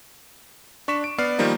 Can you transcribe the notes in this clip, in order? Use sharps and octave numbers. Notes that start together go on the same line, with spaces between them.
D4 C#6 B6 E7
D7
B3 D5 F6 C7
D#3 F3 G3 A#3 D#4